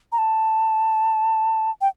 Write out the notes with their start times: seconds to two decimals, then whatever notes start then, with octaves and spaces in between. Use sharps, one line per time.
0.12 A#5
0.18 A5
1.81 G5